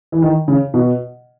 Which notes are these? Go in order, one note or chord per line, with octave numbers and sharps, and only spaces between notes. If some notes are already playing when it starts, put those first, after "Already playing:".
E3
D#3
C#3
B2